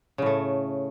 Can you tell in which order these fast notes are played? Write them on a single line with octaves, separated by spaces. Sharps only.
C#3 A2 A3